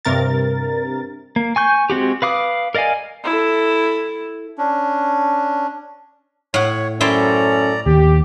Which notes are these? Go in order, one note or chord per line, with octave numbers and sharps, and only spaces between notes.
G2 C3 A#4 A6
A#3
G#5 C#6 G6
G#3 C4 F#4 G4
B4 F5 D6 D#6
A#4 D5 D#5 F5 G#5
E4 A4
C#4 D4
A2 C#5 F#5
F#2 C#4 E4 A4 C5 D5 G5 A#5
D#2 G4